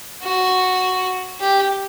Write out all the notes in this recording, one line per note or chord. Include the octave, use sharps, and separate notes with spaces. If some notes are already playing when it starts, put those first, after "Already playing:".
F#4
G4